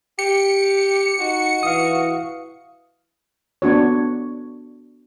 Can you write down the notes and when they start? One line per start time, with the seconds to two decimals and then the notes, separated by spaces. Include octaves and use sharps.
0.19 G4 C#7
1.20 D#4 F#4
1.63 E3 F5 D#6
3.62 B3 D4 F#4 C#5